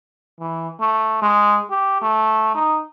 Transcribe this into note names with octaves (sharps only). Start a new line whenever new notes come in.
E3
A3
G#3
G4
A3
D#4